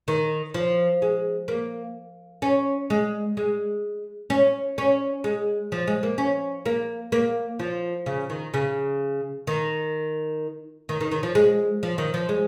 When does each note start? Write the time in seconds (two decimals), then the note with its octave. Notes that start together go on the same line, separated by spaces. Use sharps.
0.08 D#3
0.54 F3
1.02 G#3
1.48 A#3
2.42 C#4
2.90 G#3
3.37 G#3
4.30 C#4
4.78 C#4
5.24 G#3
5.72 F3
5.87 G#3
6.03 A#3
6.18 C#4
6.66 A#3
7.12 A#3
7.59 F3
8.06 C#3
8.30 D#3
8.54 C#3
9.47 D#3
10.89 D#3
11.01 D#3
11.12 D#3
11.23 F3
11.35 G#3
11.83 F3
11.98 D#3
12.14 F3
12.29 G#3